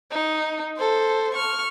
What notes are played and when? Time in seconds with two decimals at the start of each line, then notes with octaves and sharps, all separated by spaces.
0.11 D#4
0.77 A4 C5
1.34 C#6 F6